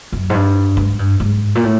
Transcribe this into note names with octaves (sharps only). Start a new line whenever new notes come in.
F#2
G#2
G2
G#2
G2
G#2
A#2
A2